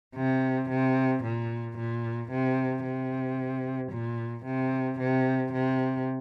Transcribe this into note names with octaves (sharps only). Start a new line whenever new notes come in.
C3
C3
A#2
A#2
C3
C3
A#2
C3
C3
C3